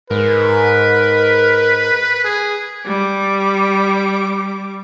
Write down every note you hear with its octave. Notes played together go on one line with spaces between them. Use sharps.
G#2 A#4 B4
G#4
G3 D6